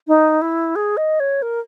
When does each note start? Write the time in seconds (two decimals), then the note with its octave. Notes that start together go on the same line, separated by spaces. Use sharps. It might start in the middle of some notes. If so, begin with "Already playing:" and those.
0.08 D#4
0.42 E4
0.76 G#4
0.97 D#5
1.20 C#5
1.42 A#4